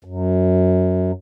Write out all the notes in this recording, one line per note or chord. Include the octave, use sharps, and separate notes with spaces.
F#2